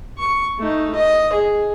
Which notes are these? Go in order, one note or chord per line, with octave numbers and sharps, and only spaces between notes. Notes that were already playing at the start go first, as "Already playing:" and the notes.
C#6
A3 D#4
D#5
G#4